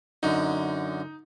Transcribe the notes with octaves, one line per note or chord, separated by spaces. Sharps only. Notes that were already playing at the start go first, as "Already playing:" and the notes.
F#2 D3 D#4